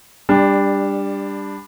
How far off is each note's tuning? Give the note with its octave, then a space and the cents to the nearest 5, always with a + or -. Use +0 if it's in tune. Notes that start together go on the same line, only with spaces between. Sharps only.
G3 +20 D4 +0